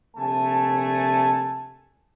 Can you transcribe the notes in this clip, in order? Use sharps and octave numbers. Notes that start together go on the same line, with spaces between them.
A#1 C3 A3 G#5 A5